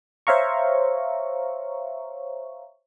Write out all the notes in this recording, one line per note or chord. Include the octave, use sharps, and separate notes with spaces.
C5 C#5 E5 F5 A#5 C#6